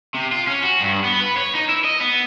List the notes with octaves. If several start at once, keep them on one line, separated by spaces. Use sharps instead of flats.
C3
F4
C#4
F#4
G2
B3
B4
C#5
D#4
E4
D#5
B3